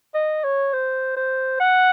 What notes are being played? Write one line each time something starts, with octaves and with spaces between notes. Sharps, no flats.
D#5
C#5
C5
C5
F#5